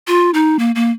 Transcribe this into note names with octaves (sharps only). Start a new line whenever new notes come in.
F4
D#4
A#3
A#3